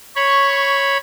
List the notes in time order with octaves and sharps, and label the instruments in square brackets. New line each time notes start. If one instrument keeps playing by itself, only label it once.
[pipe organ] C#5 B5 [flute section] C#6